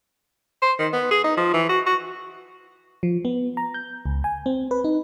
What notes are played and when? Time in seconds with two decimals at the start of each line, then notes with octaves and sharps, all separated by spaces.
0.62 C5
0.79 D#3
0.93 B3
1.11 G#4
1.24 D#4
1.37 F3
1.54 E3
1.69 F#4
1.86 F#4
3.03 F3
3.25 B3
3.57 A#5
3.74 G6
4.06 C#2
4.24 G#5
4.46 C4
4.71 B4
4.84 D#4